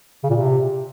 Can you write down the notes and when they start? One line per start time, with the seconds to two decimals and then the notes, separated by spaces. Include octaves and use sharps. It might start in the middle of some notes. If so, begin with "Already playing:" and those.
0.24 C#3
0.30 A#2
0.36 C3